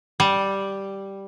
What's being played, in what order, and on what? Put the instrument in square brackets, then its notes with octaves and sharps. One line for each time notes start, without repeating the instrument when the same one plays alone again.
[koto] G3